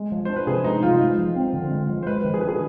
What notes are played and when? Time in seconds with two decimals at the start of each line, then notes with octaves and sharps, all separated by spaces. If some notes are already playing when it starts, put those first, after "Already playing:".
Already playing: G#3
0.12 F3
0.25 D4 C5
0.36 B4
0.47 C3 G#4
0.64 G#3 D#4
0.83 F3 F4
1.00 G#3
1.18 F3
1.36 C4
1.53 D3
1.71 G#3
1.89 F3
2.03 C5
2.06 G#3 B4
2.24 D#3
2.34 G#4
2.41 D4 B4
2.49 G#4